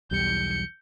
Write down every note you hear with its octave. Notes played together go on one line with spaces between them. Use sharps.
B1 E2 G3 G6 C#7